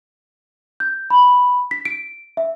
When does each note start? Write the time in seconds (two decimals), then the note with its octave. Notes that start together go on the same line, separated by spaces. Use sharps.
0.80 G6
1.10 B5
1.71 B6
1.85 D7
2.37 E5